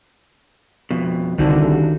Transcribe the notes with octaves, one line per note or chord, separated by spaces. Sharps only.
F2 B2
C2 D3 D#3 D#4 F#4